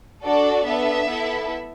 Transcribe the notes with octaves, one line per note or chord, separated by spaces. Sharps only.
D4 F#4 A4 D5
B3 D4 A4 E5
B3 E4 A4